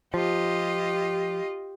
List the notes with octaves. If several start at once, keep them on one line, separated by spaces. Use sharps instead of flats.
F3 F4 G4 D#5